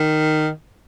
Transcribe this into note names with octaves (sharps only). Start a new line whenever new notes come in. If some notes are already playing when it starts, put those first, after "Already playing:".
Already playing: D#3